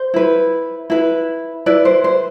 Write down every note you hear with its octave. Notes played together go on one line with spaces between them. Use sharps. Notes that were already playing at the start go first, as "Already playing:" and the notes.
Already playing: C5
E4 B4
E4 B4
E4 B4 D5
C5
C5